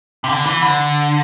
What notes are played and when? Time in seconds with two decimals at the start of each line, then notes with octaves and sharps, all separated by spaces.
0.24 C3
0.29 D3
0.45 E3
0.61 D3